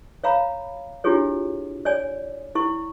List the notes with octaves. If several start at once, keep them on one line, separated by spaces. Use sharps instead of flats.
C#5 F5 A#5 B5
D4 E4 F4 G4 G#4 C#5
C#5 D5 G#5
E4 C#6